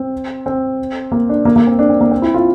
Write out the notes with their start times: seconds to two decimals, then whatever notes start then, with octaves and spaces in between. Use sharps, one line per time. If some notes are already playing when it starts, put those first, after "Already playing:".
Already playing: C4
0.46 C4
1.12 A#3
1.29 D4
1.45 A#3
1.56 A#3
1.67 C4
1.79 D4
1.90 C4
2.01 A#3
2.11 C4
2.22 E4
2.34 F4